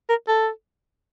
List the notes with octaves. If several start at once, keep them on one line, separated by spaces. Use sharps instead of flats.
A#4
A4